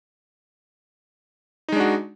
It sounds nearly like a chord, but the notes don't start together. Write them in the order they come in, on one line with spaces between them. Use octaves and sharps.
D#4 G#3 D4 F#4